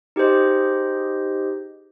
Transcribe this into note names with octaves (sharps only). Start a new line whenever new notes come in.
D#4 G4 G#4 C5 D#5